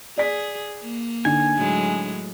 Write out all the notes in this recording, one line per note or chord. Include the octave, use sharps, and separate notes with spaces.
G#4 D5 B6
A#3
D3 D#4 G#5
A2 F#3 G#3